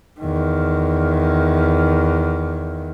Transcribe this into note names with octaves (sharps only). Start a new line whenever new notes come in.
E2 D#3